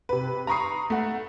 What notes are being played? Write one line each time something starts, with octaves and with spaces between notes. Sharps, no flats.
C3 B4
A#5 B5 C#6 D#6 C7
A3 F#5